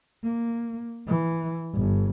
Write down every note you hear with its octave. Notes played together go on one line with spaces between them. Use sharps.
A#3
E3
G1